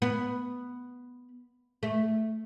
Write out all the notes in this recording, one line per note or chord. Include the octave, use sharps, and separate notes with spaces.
B3
A3